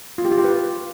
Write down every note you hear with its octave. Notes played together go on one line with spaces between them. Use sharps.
F4
G4
F4
G4
B4